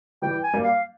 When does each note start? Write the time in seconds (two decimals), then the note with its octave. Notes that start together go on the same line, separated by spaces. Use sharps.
0.22 E3 G3 G5
0.43 G#5
0.53 G3 A#3
0.64 F5